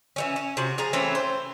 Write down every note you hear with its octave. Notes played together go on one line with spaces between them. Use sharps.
E3 G3 C#4
C#4
C3 F#4
F3 G#4 A#5
E3 A3 C4 C#4
C5